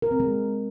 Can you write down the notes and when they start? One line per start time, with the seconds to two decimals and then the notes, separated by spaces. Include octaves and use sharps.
0.02 A#4
0.11 C4
0.20 G#3